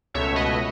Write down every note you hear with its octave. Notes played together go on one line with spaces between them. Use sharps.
C#2 B2 A3 C#5 E5
B4 D#5